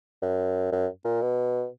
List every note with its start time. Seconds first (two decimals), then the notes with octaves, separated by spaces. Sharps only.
0.22 F#2
0.72 F#2
1.05 A#2
1.22 B2